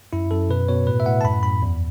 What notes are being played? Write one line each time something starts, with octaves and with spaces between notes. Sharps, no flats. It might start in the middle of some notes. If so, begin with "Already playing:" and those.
F#2 E4
F#2 A4
B2 B4
B2 C#5
A2 B4
E5
A2 F#5
A5
F#2 B5
F#2 B5
E2